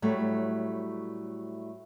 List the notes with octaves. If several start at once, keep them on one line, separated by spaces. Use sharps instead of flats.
A2 F#3 G3 A3